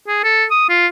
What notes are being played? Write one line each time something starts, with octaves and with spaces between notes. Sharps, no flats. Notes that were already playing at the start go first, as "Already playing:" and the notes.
G#4
A4
D#6
F4